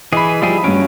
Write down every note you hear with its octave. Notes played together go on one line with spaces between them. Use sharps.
E3 G#4 D#5 B5 C7
F3 G3 E4 G#4
G2 F#3 C#4 D7